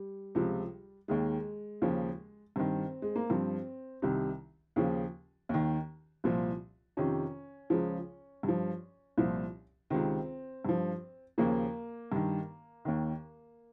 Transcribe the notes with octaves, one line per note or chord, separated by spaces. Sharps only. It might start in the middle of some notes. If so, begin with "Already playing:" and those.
Already playing: G3
C#2 C3 F3
D#2 D#3 G#3
D#2 C#3 F3
G2 D#3 C4
G#3
A#3
G2 F3 C4
C2 C3 D#3
D#2 C#3 F3
D#2 D#3
C2 A#2 F3
F2 C3 D#3 C#4
C#2 C#3 F3
G2
F3
C2 A#2 F3
C#2 C3 D#3 C4
G2 F3
D#2 C#3 F3 A#3
G2 D#3
D#2 D#3